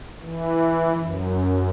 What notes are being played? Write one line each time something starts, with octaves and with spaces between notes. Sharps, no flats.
E3
F#2